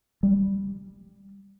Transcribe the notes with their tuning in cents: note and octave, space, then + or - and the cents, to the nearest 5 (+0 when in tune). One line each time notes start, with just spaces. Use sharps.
G3 +10